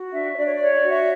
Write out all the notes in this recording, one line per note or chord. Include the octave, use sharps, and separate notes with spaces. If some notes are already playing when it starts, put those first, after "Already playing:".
Already playing: F#4
D4 E5
C#5
D4 D5
C#5
D5
C#5
D5
F#4
E5